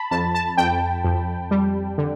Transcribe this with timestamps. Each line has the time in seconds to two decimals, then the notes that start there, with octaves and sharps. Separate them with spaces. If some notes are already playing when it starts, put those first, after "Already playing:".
Already playing: A5 B5
0.11 F2 A5
0.35 A5
0.57 F2 G5
1.05 F2
1.51 G3
1.98 D3